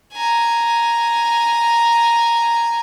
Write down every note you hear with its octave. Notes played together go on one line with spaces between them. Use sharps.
G#5 A#5